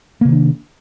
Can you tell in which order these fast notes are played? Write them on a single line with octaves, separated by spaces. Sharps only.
A#3 C3 D#3 D4